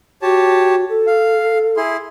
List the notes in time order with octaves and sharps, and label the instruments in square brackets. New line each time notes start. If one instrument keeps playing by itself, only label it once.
[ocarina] F#4 [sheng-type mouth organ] G4 C#5 A5
[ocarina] A4
[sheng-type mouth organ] F5
E4 G#4 C6